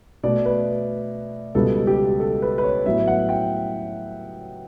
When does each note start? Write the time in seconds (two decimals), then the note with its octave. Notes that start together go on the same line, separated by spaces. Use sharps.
0.23 B2 A3 D5
0.45 B4
1.55 C#2 B2 G3 B3 A4
1.87 G4
2.20 A4
2.42 B4
2.58 B4
2.64 C#5
2.86 A2 F#3 B3 E5
3.08 F#5
3.29 G5